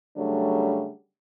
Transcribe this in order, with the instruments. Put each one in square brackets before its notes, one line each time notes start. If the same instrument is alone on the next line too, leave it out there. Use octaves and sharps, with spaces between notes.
[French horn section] C#3 F#3 G3 A3 D4